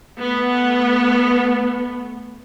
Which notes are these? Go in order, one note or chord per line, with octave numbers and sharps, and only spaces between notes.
A3 B3